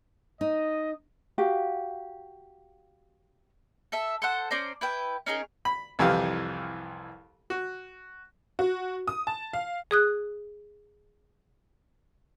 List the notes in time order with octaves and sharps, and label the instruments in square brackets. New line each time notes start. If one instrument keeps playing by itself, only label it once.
[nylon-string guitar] D#4 [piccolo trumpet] D#5
[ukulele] F#4 G4 F5
[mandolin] A4 E5
A4 C5 F#5
C#4 C5 D5 A#5
E4 B4 G5
C#4 D#4 G#4 A#4
[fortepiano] B5
C2 F2 E3 G4 F5
F#4
[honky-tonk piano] F#4
D#6
A5
F5
[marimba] G#4 D#6 F#6